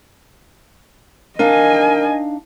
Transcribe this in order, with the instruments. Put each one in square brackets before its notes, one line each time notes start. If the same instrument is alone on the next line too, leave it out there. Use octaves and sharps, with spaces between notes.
[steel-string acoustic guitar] D4 D#4 F5 [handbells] A#4 [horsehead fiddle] D#5 G#5